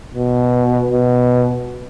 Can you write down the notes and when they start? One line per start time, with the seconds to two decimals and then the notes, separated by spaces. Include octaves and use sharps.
0.14 B2
0.88 B2